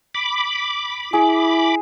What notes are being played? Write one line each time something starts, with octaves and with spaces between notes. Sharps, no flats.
B5 D6
E4 G#4